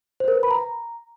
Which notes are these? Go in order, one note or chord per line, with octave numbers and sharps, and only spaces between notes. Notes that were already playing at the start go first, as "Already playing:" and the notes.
C5
A#4
B4
B5
A#5